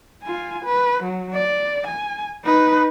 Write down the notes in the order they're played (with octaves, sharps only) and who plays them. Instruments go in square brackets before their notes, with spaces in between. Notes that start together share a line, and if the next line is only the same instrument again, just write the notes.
[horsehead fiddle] F4 G#5
B4
F#3
D5
G#5
D#4 B4